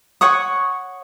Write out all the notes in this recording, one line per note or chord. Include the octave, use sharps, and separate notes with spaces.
C#5 F#5 C#6 D#6